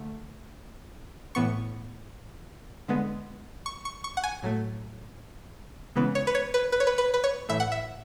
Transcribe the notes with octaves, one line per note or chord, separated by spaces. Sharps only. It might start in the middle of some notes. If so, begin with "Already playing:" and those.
Already playing: D3 A3
A2 E3 B3 C#6
D3 G#3 B3
C#6
C#6
C#6
F#5
G#5
A2 F#3 A3
C#3 E3 G#3 B3
C#5
B4
C#5
B4
B4
C#5
B4
B4
B4
C#5
A2 E3 A3 E5
F#5
E5